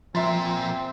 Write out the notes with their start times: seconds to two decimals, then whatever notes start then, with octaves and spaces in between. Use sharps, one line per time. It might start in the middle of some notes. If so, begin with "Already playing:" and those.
0.15 A#2 F3 C4 E5 C6 A6